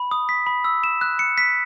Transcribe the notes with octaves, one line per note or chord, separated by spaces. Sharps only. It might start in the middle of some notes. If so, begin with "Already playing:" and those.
Already playing: B5
D#6
B6
B5
E6
E7
F#6
C#7
B6